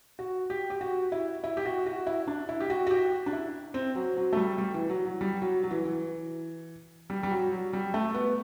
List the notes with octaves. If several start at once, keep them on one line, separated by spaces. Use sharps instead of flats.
F#4
G4
G4
F#4
E4
E4
G4
F#4
F#4
E4
D4
E4
G4
F#4
F#4
G4
D4
E4
C4
F#3
F#3
A3
G3
G3
E3
F#3
F#3
G3
F#3
F#3
E3
E3
G3
G3
F#3
F#3
G3
A3
B3